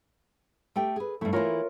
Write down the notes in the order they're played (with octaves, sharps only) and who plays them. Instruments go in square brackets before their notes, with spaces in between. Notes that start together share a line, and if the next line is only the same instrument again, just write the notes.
[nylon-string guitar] A3 G4 G5
G#4 B4
[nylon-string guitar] G2 E4 [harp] A3
[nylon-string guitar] E3 A#3 E4 [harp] F4 A#4 C#5